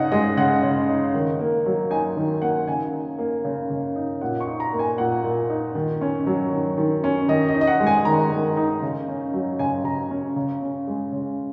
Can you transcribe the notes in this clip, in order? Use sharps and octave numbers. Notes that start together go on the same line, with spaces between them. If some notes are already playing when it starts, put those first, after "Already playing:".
Already playing: C#3 D#4 D#5 F#5
G#3 D#5
C#3 F#5
C#3
D#4
D#3
A#3
F#3
D#4 G#5
D#3
A#3 F#5
C#3 G#5
D#4
A#3
C#3
C#3
D#4
A#2 F#5
C#6
D#4
A#5
A#3
G#5
A#2 F#5
A#2
D#4
D#3
C#4
F#3
D#3
D#3
C#4
D#3 D#5
D#5
D#4
D#5
F#5
G#3
G#5
D#3 A#5
D#3
D#4
C#3
C#4
F#3
C#3 G#5
C#3 A#5
C#4
C#3
C#4
G#3
C#3